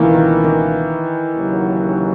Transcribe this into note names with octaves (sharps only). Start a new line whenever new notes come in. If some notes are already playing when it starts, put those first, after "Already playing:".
Already playing: C#2 B2 D#3 E3 A#3
D#3
D#3
D#2 C#3 F#3